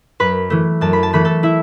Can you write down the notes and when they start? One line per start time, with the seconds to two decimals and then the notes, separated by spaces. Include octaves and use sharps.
0.20 F#2 B4 B5
0.50 E3 A3
0.81 F#2 A5
0.93 B5
1.03 A5
1.13 E3 A3 B5
1.25 A4 A5
1.43 E4 E5